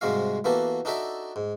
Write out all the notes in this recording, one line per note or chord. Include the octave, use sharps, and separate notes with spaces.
G#2 C3 G3 G#3 F#4 F5
E3 A#3 B3 F#4 G4 A4
D4 D#4 F#4 A4 D5 E5
G#2